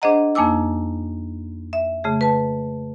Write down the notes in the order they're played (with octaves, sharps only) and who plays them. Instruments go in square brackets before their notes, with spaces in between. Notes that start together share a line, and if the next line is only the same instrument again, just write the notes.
[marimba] D4 G#4 C5 D#5 F#5 A#5
F2 A#3 D#4 G#5 D6 E6
E5
C#3 A3 G#4
B4 A5